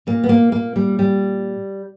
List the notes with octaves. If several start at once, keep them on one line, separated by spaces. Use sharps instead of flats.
A#2 A#3
B3
A#3
A#3
G3
G3